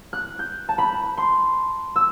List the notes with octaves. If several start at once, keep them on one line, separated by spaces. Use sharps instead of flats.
F#6
G6
A5
B5
C6
E6